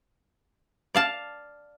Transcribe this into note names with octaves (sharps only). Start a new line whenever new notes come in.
D5 F5 A5